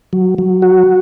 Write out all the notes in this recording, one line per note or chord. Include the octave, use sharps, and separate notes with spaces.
F#3
F#3
F#4